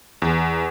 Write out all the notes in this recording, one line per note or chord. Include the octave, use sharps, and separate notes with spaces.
E2